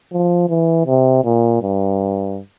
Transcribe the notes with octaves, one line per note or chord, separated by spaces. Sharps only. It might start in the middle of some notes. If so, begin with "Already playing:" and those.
F3
E3
C3
A#2
G2